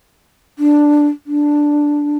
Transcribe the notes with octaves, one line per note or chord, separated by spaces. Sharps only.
D4
D4